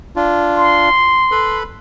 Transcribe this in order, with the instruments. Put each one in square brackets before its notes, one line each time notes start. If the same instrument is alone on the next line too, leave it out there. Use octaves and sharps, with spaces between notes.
[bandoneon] D4 F4
[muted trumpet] C6
[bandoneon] A4 B4 B5